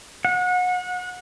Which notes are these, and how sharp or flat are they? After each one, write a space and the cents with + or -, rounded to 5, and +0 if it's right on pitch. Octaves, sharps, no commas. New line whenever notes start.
F#5 -30